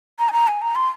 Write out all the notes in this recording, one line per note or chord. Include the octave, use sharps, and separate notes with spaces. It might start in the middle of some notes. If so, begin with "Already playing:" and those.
A#5
G#5
A#5
G#5
A#5
C6